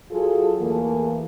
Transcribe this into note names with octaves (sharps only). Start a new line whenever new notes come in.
F#3 F4 G#4 A4
E2 E3 A3 A#3